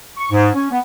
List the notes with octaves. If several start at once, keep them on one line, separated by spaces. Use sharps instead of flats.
C#6
G#2
C#4
B3